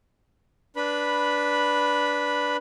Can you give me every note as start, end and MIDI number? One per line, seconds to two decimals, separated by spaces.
0.76 2.57 62
0.76 2.57 71
0.76 2.57 83